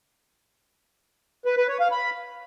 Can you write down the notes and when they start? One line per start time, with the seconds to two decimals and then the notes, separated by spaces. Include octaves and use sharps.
1.45 B4
1.57 B4
1.68 C#5
1.80 F5
1.92 B5